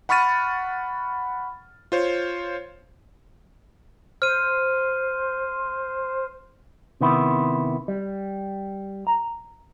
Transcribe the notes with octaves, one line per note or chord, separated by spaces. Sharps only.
F#5 B5 C#6 F6 A6 D#7
F4 C5 C#5
C5 F6 D#7
C3 D#3 B3 E4
G3
A#5